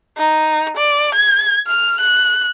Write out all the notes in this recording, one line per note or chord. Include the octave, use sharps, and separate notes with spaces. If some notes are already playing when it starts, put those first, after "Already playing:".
D#4
D5
G#6
F6
F#6